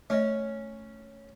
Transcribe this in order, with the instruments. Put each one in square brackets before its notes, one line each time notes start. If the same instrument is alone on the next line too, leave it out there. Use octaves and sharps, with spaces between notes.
[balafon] A3 D#5 [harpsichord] C#4